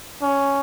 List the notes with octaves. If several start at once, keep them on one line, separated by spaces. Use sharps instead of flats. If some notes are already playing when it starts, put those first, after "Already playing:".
C#4